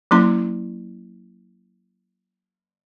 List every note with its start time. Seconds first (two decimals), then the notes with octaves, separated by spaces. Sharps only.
0.11 F#3 A#3 C#4 E4 C6